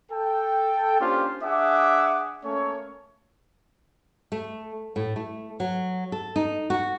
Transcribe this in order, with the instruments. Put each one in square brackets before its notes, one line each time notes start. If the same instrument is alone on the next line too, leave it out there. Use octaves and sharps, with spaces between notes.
[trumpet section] A4 G5
A#3 C#4 D4 F4 G4 C5
D4 G#4 E5 F#5 D6
A3 A#3 C#4 A4 C#5
[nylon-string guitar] A3
A2
A3
F#3
A4
D#4
F#4